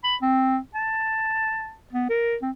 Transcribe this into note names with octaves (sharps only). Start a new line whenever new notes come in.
B5
C4
A5
B3
A#4
C4